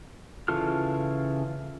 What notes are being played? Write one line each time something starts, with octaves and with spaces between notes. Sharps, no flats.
C#3 E3 F4 A4 F6